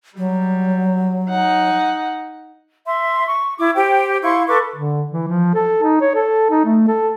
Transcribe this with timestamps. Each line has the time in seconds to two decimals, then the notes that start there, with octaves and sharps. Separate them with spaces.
0.18 F#3 G3
1.29 D#4 F#5
2.86 E5 C6
3.27 C#6
3.59 E4 D6
3.75 G4 C5 G5
4.23 E4 F5 C6 C#6
4.48 A4 B4 C#6 D6
4.76 D3
5.11 E3
5.28 F3
5.54 A4
5.83 D#4
6.01 C#5
6.15 A4
6.51 D#4
6.65 A3
6.87 A4